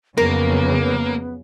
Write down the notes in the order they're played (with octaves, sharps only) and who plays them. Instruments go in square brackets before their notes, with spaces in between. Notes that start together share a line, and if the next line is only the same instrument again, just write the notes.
[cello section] F2 C#3 F#3 [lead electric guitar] A#3 [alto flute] B3 [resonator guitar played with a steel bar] A#4